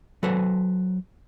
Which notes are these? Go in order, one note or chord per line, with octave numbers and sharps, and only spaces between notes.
F#3 A4 B4 C5